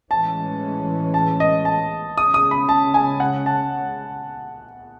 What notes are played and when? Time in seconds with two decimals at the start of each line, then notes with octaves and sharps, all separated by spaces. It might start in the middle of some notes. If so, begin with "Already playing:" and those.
0.11 A2 E3 G#3 C#4 A5
1.14 A5
1.40 D#5
1.65 A5
2.17 C#3 G#3 C#4 D#6
2.34 D#6
2.51 B5
2.69 A5
2.94 G#5
3.20 F#5
3.46 A5